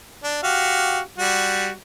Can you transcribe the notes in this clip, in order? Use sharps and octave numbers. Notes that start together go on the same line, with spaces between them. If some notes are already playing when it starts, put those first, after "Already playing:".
D4
F#4 G4 F5
G3 F#4